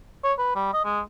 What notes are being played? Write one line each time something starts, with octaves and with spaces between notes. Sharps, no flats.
C#5
B4
G3
D#5
G#3